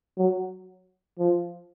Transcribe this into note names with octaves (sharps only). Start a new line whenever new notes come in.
F#3
F3